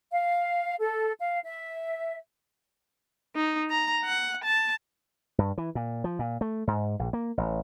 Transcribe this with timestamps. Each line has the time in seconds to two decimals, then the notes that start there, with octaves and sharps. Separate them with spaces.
0.11 F5
0.79 A4
1.19 F5
1.43 E5
3.35 D#4
3.70 A#5
4.04 F#5
4.44 A5
5.38 G2
5.58 E3
5.75 A#2
6.04 F3
6.19 A#2
6.41 A3
6.67 G#2
6.99 A#1
7.13 A#3
7.38 A1